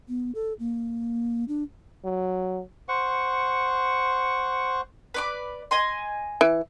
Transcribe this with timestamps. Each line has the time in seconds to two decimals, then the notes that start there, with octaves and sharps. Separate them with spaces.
0.09 B3
0.35 A4
0.59 A#3
1.48 D4
2.05 F#3
2.88 C5 F#5 C#6
5.14 B4 D5 D6
5.71 D#5 G#5 C6
6.41 E3